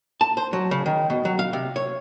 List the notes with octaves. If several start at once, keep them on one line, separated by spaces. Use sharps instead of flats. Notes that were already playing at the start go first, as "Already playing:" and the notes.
A5
C5
F#3
C#3
D#3
B2
F#3
F5
C3
C#5